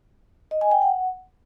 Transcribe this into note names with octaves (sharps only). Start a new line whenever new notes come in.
D#5
G#5
G5
F#5